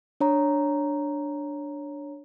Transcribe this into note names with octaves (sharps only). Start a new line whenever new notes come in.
D4 C#5 A#5